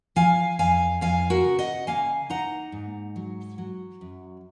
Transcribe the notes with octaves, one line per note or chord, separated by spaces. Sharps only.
F3 F5 G#5
F2 F5 G#5
F2 F5 G#5
F#4 A#4
C#3
D#5 F#5
A#3 F5 G#5
D#4 F#5 A#5
G#2
F#3
F#3
F#2